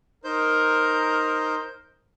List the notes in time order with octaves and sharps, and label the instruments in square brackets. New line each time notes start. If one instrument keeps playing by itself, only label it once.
[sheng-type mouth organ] D#4 C5 G6 [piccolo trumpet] A#4